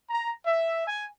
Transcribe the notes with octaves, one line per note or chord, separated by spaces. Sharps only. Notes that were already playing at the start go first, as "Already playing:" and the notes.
A#5
E5
G#5